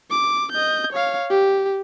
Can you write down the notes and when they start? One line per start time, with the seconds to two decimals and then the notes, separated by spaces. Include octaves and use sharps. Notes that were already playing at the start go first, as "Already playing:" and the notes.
0.11 D6
0.52 D#5 G6
0.92 C#5 F5
1.30 G4